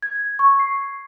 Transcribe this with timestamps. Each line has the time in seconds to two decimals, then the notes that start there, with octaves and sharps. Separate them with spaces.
0.02 G#6
0.39 C#6
0.59 C7